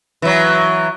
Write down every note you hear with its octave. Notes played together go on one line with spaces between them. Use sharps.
E3 F#3